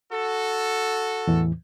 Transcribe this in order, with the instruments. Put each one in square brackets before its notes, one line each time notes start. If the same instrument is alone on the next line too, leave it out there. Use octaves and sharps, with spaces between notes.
[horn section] F#4 A4
[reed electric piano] E2 A2 E3